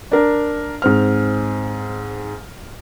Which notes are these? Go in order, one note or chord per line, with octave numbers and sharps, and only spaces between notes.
D4 A#4
G#2 C4 F6